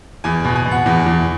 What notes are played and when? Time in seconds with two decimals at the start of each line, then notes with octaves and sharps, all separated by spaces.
0.24 E2 G#5
0.45 B2
0.56 G#5
0.65 B2
0.71 F#5
0.86 E2
1.06 E2